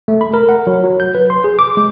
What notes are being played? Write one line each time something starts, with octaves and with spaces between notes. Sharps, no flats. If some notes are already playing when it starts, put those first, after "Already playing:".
A3
B5
A#4
F#5
F#3
F#3
G6
B4
C6
G#4
D6
G#3